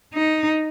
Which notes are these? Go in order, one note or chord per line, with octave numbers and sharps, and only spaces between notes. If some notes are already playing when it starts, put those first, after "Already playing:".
D#4